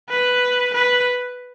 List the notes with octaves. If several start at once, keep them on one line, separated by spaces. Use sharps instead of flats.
B4
B4